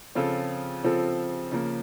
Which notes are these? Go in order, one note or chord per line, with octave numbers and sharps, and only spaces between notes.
C#3 F3 C4 F4 A4
C#3 F3 C4 F4 A4
C#3 F3 A#3